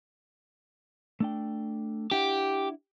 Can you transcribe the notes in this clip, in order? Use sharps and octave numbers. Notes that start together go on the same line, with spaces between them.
A3 D4 G5
D4 E4 G4 F#5